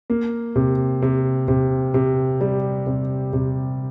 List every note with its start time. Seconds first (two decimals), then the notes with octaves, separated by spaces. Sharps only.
0.10 A#3
0.56 C3
1.02 C3
1.48 C3
1.94 C3
2.41 G3
2.87 C3
3.33 C3